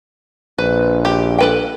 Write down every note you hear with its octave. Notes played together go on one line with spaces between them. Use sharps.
A#1 B4
G4
A4 B4 G5